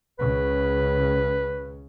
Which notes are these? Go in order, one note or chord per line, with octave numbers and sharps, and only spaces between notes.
C#2 C#3 B4